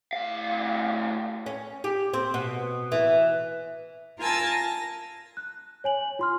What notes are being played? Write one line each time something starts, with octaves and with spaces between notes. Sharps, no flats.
A2 F5
C#4
G4
C4
B2
E3
F4 A#4 G#5 A5 E6
A#6
F#6
C#5 G#5 F#7
F4 C6 F6